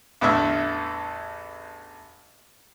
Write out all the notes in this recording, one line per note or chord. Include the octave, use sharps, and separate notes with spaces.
A1 E2 A2 D3 E5 F6